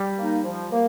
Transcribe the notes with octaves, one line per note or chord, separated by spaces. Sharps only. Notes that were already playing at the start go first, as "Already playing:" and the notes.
Already playing: G3
A#3 D#4
F3
A#3